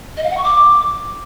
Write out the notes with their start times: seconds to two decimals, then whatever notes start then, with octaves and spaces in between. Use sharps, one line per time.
0.17 D#5
0.24 F5
0.30 F#5
0.37 C#6
0.44 D6